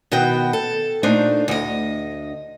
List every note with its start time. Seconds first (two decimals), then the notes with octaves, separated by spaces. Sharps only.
0.12 B2 D#3 B3 F#4 G5
0.53 A4
1.03 A#2 A3 D4 D#4 C5
1.48 D2 D#5